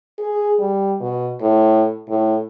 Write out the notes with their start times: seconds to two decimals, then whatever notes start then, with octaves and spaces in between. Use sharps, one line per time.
0.18 G#4
0.59 G3
1.00 B2
1.40 A2
2.09 A2